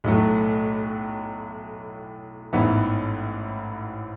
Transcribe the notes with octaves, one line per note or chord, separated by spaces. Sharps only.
B1 A2 F#3 A3
A1 G#2 E3 B3 E4